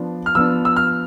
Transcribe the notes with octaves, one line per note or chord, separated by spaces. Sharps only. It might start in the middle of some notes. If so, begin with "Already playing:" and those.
Already playing: F3 B3 D4
F6
F3 B3 D4 E6
E6
F6